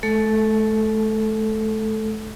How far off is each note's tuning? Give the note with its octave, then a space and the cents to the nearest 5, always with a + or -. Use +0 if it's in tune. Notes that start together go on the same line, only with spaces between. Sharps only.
A3 -35 A4 +0